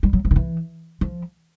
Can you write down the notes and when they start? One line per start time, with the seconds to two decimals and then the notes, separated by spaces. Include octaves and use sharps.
0.03 G3
0.13 F#3
0.25 F3
0.31 D#3
0.36 E3
1.01 F3